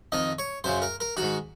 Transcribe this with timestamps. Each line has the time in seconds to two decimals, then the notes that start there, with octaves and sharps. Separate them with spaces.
0.12 F2 D#3 D#5
0.39 C#5
0.64 F#2 C#3 C5
0.82 A#4
1.00 A#4
1.17 G#2 D#3 F#4